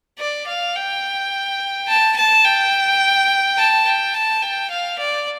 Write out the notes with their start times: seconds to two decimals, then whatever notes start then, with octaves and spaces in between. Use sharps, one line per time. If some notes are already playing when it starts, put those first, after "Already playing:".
0.19 D5
0.47 F5
0.76 G5
1.88 A5
2.16 A5
2.45 G5
3.57 A5
3.85 G5
4.14 A5
4.42 G5
4.70 F5
4.99 D5